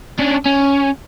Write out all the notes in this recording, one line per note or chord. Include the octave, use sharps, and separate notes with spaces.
C#4 D4
C#4